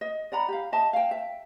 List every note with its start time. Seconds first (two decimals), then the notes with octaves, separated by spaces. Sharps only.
0.01 D#5
0.32 D5 F#5 A#5 B5
0.48 G4 F5
0.72 D#5 E5 A5
0.93 F5 G5
1.11 E5